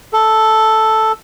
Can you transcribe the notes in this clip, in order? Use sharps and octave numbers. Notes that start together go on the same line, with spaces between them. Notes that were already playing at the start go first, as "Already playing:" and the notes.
A4